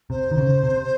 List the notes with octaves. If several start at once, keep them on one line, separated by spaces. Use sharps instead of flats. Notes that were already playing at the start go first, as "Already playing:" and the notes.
C3 C5
D#3
C#3
C3